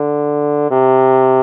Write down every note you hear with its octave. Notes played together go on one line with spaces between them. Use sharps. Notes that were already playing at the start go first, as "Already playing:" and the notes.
Already playing: D3
C3